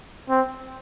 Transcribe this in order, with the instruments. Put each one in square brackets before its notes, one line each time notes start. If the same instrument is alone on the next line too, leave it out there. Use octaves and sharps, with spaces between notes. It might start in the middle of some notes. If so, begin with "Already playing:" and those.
[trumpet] C4